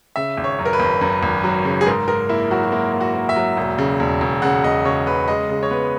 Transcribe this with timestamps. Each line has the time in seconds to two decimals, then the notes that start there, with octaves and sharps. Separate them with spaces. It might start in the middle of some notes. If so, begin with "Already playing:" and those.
0.16 C#3 E5
0.37 G#1
0.44 C#5
0.59 F#2
0.65 A#4
0.73 B4
0.80 G#1
1.01 F#2
1.23 G#1
1.44 F#3
1.65 C#3
1.81 G#4
1.86 G#2 A#4
2.08 G#2 A#4
2.29 A#3 E4
2.51 F#3 F#4
2.63 F#4
2.72 A#3 E4
2.93 A#3
3.01 F#4
3.15 A#3
3.29 E5
3.36 F#3
3.57 E1
3.78 C#3
4.00 E1
4.21 E1
4.42 C#3 F#5
4.64 E1 D#5
4.85 C#3 C#5
5.06 C#3 B4
5.28 G#3 D#5
5.49 C#3
5.63 C#5
5.71 B3 B4